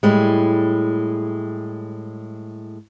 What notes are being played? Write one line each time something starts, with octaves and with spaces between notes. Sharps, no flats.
A2 G3 G#3